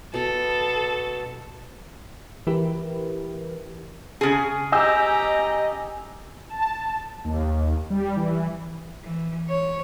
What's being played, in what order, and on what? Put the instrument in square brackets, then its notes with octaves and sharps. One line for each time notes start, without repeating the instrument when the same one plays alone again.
[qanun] B2 A5 [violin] A4
[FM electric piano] E3 E4 G4 A#4 B4
[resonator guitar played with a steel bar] C#3 G#4
[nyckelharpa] G4 A#5 [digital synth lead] D#5 [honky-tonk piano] G#5 E6 G6
[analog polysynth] A5
D#2
G3
E3
[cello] E3
C#5